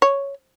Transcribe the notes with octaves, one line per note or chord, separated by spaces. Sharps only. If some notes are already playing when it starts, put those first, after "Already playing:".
C#5